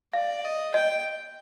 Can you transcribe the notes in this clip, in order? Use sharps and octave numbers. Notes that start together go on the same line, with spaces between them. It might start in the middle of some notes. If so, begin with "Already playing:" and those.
D5 F5
D#5
D#5 G5